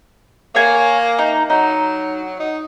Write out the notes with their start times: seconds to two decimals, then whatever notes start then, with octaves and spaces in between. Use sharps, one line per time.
0.55 A#3 C#5 G#5
1.19 D#4
1.50 F#3 D#4
2.39 D#4